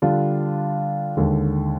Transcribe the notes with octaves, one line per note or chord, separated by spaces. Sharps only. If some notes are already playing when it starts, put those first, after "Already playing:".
D3 G3 D4 F4
D#2 D3 G#3